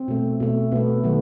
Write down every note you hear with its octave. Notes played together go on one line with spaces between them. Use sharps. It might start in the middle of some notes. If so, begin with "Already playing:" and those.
Already playing: C4
B2 A3
B2 A3
B2 A3 B3
D#3 F#3 A3